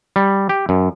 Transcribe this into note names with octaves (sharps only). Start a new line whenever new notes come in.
G3
G4
F#2